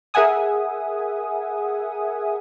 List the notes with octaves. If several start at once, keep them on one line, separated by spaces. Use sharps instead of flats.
G#4 A#4 E5 F#5 G#5 D#6